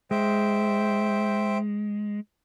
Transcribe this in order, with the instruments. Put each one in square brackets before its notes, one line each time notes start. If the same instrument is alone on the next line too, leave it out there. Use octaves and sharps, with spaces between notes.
[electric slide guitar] G#3 [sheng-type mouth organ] C5 E5 G5